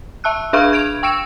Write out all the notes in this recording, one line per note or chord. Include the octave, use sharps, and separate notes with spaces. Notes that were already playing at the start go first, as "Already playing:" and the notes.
E5 A5 E6 F#6
D4 G#4 E5 F5 B5 F6
G#6 D7 F7
G5 C#6 E6 D7 E7